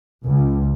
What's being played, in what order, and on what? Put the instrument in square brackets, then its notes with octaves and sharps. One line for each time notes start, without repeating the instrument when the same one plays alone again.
[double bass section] C#2